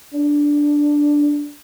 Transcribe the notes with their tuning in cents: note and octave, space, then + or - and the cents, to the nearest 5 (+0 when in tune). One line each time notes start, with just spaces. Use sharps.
D4 -5